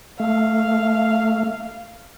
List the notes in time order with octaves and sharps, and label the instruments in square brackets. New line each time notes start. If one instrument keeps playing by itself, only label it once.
[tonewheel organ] A3 [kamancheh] F5